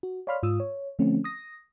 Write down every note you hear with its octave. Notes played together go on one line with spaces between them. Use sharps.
F#4
C#5 D5 F5 B5 C6 F6
G#2 F4 D#6 E6
C#5
D3 F3 A3 C4 C#4
D#6 A#6